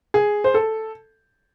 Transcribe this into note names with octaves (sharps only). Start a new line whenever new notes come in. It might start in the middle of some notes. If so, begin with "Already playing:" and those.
G#4
C5
A4